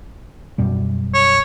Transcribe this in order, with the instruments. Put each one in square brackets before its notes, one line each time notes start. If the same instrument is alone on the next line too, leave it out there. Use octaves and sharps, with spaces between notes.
[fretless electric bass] F#2 B2 G3
[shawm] C#5